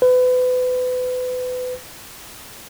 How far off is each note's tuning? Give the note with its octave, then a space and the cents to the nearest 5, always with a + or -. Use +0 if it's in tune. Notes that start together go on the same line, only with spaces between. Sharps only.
B4 +30